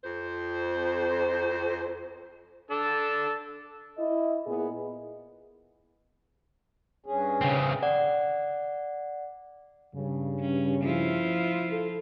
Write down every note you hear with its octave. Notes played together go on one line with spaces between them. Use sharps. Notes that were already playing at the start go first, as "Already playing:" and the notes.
F2 C5
D4 A4
E4 D#5
A#2 B3 E4 G#4
G2 C#4 G#4
C#3 C4
D5 F#5
G2 C#3
C#4
F3 E4 F4
A4